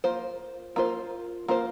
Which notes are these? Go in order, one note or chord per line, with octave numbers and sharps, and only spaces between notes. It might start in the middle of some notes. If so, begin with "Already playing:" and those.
A#3 F4 C5
A#3 F4 C5
A#3 F4 C5